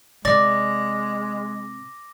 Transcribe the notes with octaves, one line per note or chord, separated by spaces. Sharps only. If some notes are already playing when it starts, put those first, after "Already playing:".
C3 G#3 D5 D6 A#6